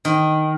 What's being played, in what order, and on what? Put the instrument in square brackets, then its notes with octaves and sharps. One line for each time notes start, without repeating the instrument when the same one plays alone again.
[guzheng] D#3